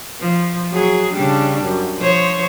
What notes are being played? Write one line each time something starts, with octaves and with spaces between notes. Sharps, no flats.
F3
F#3 G#4
C#3 G3 D4
F#2
F3 C5 C#5